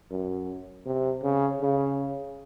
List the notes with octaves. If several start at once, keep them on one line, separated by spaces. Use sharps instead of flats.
F#2
C3
C#3
C#3